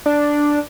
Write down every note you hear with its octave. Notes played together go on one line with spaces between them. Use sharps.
D4